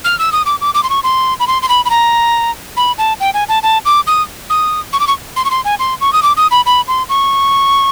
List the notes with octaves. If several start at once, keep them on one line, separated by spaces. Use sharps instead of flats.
F6
E6
D#6
D6
D6
D6
C6
C#6
C6
B5
C6
C6
B5
B5
A#5
B5
A5
G5
G#5
A5
A5
D6
D#6
D#6
C#6
D6
C#6
C6
C#6
C6
G#5
C6
C#6
D#6
D6
D#6
B5
B5
C6
C#6